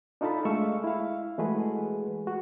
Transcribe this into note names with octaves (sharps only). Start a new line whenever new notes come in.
D4 D#4 F4 A4 A5 B5
G#3 A3 F5 C#6 E6
E4 F5
E3 G#3 A3 F#4 G#4 B4
F#4